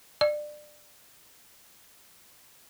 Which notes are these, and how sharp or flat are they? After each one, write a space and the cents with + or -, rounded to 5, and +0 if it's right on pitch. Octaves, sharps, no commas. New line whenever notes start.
D5 +25